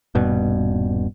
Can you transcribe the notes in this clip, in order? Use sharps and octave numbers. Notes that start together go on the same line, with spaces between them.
D#1 G2 B2